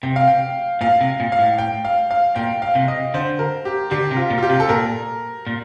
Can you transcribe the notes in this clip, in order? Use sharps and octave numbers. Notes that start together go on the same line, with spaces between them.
C3 G5
F5
G5
A#2 F5
C3
A#2
F5
A2
G5
F5
F5
A#2 G5
F5
C3
D#5
D3 C5
A#4
G4
D3 G4
C3
F4
A#2
F4
G4
C3
A4
A#2 A#4
A#2